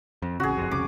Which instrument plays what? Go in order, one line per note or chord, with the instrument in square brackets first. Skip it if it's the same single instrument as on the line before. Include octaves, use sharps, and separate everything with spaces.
[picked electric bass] F2
[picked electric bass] A1 C#3 [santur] F#4 G#4
[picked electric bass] F#1 F2
[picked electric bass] C2 F2 C#3 [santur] D6